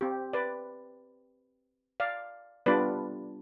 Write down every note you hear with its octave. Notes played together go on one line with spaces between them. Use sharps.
C4 G4
B4 D5
D5 F5
G3 B3 D4 F4 B4 D5